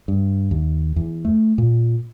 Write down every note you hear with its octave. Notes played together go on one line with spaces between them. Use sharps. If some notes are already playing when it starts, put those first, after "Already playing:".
G2
D#2
E2
A3
A#2